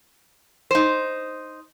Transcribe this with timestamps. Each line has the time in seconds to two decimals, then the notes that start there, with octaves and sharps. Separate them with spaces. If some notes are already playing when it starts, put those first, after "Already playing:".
0.71 D#4 C5